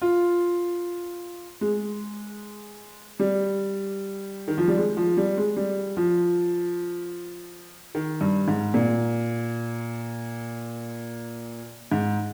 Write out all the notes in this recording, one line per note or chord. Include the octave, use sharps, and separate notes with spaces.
F4
G#3
G3
D#3
F3
G3
G#3
F3
G3
G#3
G3
F3
D#3
G2
G#2
A#2
G#2